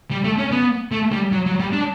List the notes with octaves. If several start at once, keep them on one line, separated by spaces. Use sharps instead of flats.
G3
A3
C#4
B3
A3
G3
F#3
F#3
G3
D4